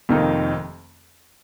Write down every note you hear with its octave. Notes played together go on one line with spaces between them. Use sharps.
F1 F2 D#3 A#3 D#4